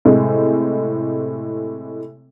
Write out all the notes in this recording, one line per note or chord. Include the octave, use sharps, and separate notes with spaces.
A2 C3 G#3